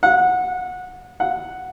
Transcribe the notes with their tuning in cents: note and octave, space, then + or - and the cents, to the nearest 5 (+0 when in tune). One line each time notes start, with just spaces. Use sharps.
F#5 -20
F#5 +0